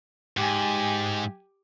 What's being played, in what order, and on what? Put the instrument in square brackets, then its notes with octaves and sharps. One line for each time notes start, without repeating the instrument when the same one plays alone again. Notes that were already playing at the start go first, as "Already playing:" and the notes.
[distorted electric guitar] G#2 [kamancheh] G4 G#5